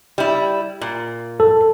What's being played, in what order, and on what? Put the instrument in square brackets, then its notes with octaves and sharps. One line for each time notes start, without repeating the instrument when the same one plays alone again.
[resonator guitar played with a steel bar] G3 E4
A#2
[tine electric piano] A4